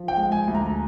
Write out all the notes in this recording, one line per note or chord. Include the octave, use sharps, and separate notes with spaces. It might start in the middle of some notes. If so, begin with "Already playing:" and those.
Already playing: F3
G5
G#3
G#5
D2
A#5